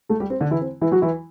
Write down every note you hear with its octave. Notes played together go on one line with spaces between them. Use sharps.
A3 A4
G3 G4
C4
D3 D4
E3 E4
C4
E3 E4
F#3 F#4
E3 E4